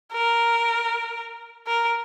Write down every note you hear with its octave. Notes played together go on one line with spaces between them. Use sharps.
A#4
A#4